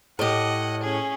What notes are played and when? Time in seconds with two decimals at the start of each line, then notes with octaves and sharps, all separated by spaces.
0.19 A2 G4 D#5 F#5
0.83 C#4 G#4